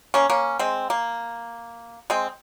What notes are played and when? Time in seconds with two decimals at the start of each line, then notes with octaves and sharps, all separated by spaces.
0.14 A#3 C#4
0.30 A#3 C#4
0.59 G#3 C4
0.90 A#3
2.10 G#3 C4